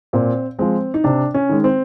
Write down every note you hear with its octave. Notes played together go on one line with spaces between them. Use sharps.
A#2 C4
F3 G#3 C4
D#4
C3 D4
C#4
D#3 G#3
C4